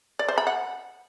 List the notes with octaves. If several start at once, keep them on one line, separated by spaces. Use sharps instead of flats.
D5
C5
B5
F#5